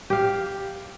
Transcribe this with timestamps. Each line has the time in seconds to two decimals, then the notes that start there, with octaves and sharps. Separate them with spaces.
0.10 G4 F5